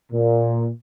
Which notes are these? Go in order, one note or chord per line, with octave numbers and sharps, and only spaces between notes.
A#2